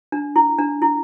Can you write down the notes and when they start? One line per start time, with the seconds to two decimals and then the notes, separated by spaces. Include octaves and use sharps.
0.12 D4
0.36 E4
0.59 D4
0.82 E4